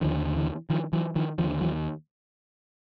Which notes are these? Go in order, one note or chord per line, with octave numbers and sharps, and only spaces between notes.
D#2 D3 D#3 F3
D3 E3
D#3 F3
E3 F#3
D#3 F3
D#2 D3 D#3 F3
E3 F#3